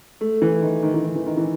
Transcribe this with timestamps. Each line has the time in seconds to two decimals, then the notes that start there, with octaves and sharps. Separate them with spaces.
0.21 A3
0.42 E3
0.62 D#3
0.83 D#3
0.94 E3
1.04 D#3
1.16 E3
1.27 D#3
1.37 E3